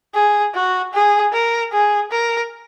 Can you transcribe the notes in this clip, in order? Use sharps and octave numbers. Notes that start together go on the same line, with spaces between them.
G#4
F#4
G#4
A#4
G#4
A#4